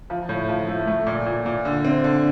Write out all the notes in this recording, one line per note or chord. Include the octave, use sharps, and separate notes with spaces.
F3
A2
F3
A3
A3
A#2
A#2
A#2
D3
C4
D3